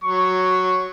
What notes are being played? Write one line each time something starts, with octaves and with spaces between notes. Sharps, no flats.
F#3 C#6